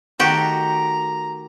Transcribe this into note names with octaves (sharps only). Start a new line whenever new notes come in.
D#3 A3 F#4 G4 A4 A#5